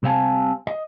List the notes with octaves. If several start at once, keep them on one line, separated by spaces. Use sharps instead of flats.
C2 C3 C4 F5 G#5 A5
D#5